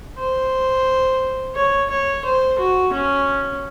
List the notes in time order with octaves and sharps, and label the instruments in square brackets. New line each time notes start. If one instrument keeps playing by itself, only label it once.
[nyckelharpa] C5
C#5
C#5
C5
F#4
C#4